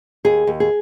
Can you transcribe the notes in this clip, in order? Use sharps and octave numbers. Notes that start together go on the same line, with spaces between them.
D#2 G#4
D#2
G#4